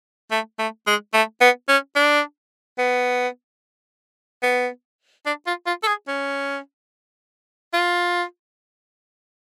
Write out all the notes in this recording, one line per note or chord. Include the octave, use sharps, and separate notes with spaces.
A3
A3
G#3
A3
B3
C#4
D4
B3
B3
D4
F4
F4
A4
G#4
C#4
F4